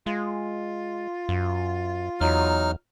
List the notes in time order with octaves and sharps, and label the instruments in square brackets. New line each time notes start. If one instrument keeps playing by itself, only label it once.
[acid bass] G#3 [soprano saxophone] F4
[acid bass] F#2
[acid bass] E2 [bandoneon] F#3 D#4 F6